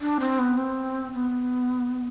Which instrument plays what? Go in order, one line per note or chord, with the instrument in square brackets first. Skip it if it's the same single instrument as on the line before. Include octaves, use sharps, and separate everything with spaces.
[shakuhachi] D4
C4
B3
C4
B3